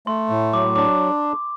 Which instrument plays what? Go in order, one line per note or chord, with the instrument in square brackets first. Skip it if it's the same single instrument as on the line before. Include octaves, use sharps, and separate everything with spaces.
[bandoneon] A3 [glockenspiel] C6
[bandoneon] A2
[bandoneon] F#3 [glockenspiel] D6
[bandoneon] D4 [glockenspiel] D6